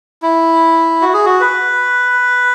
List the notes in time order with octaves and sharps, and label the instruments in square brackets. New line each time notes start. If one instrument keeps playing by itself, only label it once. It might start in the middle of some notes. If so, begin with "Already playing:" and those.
[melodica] E4
F#4
G#4
F#4
B4